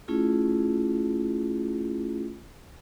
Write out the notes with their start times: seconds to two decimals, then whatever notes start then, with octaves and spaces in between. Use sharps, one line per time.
0.08 A3 C#4 E4 F4 G#4